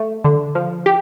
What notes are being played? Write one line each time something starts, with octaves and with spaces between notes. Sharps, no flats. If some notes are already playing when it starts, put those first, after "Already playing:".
Already playing: A3
D3
F3
G4